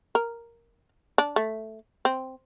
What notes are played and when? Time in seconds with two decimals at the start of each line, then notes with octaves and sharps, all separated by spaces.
0.15 A#4
1.18 D4
1.36 A3
2.05 C4